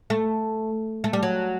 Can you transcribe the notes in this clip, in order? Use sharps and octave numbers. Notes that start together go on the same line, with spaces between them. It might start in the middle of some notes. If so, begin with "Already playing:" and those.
A3
A3
G3
F#3